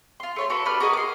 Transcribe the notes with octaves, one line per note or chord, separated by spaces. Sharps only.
F4 C6
A3 C#5 C6
F#4 A4 B4
D4 G4 B4 F6
F#4 G#4 A#4 D#5
C6 D6